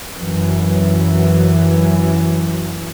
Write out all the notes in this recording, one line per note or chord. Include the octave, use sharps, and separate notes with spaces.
F#2 E3 F#3